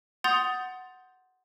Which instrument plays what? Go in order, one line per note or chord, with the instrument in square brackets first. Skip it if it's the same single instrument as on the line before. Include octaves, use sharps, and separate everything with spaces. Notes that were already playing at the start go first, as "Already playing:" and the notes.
[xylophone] F#5 C6 D#6 G6 A6 F7